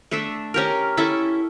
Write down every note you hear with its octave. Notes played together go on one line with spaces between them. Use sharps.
A3 D4 A4 E5
C#4 G4 A#4
C#4 E4 A4